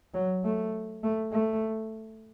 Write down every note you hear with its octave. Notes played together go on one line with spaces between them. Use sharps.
F#3
A3
A3
A3